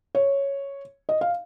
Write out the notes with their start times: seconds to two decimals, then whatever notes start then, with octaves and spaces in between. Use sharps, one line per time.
0.15 C#5
1.09 D#5
1.21 F5